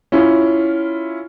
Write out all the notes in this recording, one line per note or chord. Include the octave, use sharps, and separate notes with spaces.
C#4 E4 F4